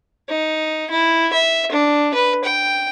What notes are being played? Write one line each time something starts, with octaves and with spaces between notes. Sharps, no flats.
D#4
E4
E5
D4
B4
G5